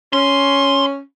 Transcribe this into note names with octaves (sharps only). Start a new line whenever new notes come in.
C#4 C6